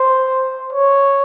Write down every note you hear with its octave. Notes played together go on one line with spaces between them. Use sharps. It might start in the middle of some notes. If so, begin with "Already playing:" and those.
Already playing: C5
C#5